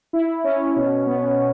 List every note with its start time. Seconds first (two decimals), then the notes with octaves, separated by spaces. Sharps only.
0.13 E4
0.44 C#4
0.76 B2
1.06 B3